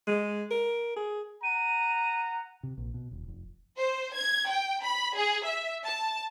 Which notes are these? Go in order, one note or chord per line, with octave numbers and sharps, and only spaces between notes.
G#3
A#4
G#4
F#5 A#5 D#7
C3
A#1
B2
D#1
F1
C5
G#6
G5
B5
G#4
E5
A5